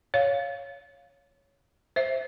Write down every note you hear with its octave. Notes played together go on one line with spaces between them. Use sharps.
C#5 F5
C5 E5